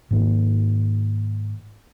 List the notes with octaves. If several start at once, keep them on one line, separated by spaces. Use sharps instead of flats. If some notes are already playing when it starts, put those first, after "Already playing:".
G#2 D#3 A#3